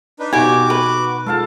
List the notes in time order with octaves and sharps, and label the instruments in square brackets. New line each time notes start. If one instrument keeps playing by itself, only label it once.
[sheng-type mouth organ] D4 D#4 B4
[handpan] B2 D#4 [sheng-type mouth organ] F#4 D6 [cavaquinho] G4 G#5
[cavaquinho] B4
[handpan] G#3 F4 [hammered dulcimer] A4 F5 A5